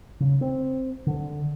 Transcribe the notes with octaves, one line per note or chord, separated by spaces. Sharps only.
C#3
C4
D3